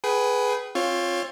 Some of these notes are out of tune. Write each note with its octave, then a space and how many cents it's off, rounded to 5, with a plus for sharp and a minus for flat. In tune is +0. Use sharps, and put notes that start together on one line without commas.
G#4 +10 B4 +0 G5 -35
C4 +30 F4 +10 C#5 +0